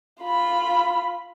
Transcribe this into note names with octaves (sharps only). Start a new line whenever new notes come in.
F4 B5